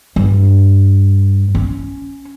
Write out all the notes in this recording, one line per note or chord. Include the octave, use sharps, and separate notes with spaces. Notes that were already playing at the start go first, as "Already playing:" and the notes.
G2
C#4